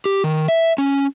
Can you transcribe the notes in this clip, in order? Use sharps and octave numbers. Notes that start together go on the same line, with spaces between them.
G4
D#3
E5
C#4